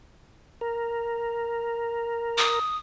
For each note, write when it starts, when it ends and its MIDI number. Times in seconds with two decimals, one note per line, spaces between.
0.61 2.59 70
2.38 2.77 87